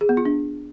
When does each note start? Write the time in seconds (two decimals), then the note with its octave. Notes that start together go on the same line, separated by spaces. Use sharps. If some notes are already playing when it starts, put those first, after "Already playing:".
0.01 G#4
0.09 B3
0.17 F4
0.25 D4